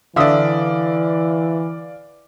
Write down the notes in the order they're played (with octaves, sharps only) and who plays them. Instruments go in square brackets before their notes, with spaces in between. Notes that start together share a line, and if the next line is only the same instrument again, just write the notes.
[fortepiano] D3 E5 D#6 [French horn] E3 [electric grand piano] D5 F5